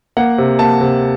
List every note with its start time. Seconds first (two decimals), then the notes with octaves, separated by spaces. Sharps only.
0.17 A#3 F#5
0.38 C3
0.59 A#3 A5
0.81 C3